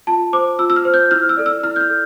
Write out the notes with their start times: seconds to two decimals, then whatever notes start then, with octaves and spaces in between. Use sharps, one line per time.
0.07 F4 A5
0.33 C5 D6
0.59 F4 E6
0.70 E6
0.76 F6
0.85 C5
0.94 G6
1.11 E4 F6
1.29 E6
1.37 A4 D5
1.46 E6
1.63 E4 F6
1.76 G6
1.81 F6
1.90 A4